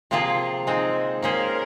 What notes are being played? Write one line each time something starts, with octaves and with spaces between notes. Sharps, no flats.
C3 F3 A#3 F4 G#4
G#3 C4 D#4
A#3 C#4 G#4 A#4 C5